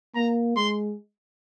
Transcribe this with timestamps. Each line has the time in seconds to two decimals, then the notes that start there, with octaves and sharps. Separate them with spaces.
0.15 A#3 A#5
0.56 G#3 C6